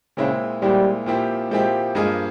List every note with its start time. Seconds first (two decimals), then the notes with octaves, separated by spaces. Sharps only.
0.17 A#2 C#3 G#3 C4 E4
0.62 A#2 G3 G#3 C4 E4
1.06 A#2 F3 C4 E4 G4
1.51 A#2 F3 G#3 C4 E4 G4
1.95 G2 F3 G#3 A#3 F4 G#4